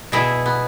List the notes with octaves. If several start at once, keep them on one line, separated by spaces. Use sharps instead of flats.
B2 E4 G#4
B3